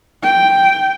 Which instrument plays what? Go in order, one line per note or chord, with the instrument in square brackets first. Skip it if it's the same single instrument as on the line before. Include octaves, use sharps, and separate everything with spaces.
[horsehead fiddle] G5